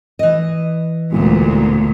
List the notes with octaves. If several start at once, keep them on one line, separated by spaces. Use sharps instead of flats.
E3 D#5
E1 D2 A#2